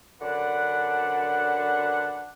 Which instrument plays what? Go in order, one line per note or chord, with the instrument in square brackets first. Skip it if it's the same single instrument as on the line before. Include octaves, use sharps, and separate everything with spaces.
[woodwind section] F#2 D3 D4 B4 F#5